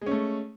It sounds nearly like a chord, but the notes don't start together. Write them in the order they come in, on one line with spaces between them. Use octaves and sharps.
G#3 C#4 A3